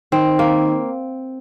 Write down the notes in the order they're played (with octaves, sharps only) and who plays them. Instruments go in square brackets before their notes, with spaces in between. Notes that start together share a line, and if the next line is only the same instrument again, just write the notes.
[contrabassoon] D#3 [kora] C4
[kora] A#3